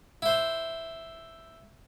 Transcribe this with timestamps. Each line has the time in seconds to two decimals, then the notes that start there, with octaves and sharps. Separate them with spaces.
0.22 E4 C5